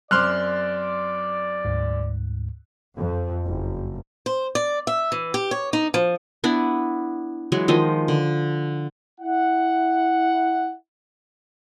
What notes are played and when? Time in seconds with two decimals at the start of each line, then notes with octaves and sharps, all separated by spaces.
0.11 F#2 C4 D5 C6 D6 F6 F#6
1.65 D2 G#2
2.98 F2
3.47 F#1
4.26 C5
4.55 D5
4.87 E5
5.12 E3
5.34 G4
5.51 C#5
5.73 D#4
5.94 F3
6.44 B3 D4 E4
7.52 E3 F#3 G#3
7.68 D#3 F3 D#5
8.08 D3
9.20 E4 F#5